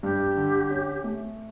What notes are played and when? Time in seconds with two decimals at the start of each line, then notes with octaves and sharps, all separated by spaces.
0.03 G2 G4
0.37 D3
0.70 C#4
1.04 A3